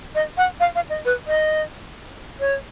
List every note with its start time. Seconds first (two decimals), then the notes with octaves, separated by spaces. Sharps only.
0.15 D#5
0.37 F#5
0.60 F5
0.75 F5
0.90 D#5
1.05 B4
1.27 D#5
2.40 C#5